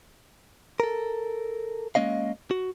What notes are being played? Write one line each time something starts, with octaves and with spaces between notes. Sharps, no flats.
A4 A#4
G#3 A#3 C#4 D#5 F5
F#4